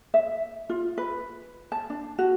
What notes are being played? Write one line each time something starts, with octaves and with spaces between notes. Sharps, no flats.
E5
F4
B4
A5
D4
F#4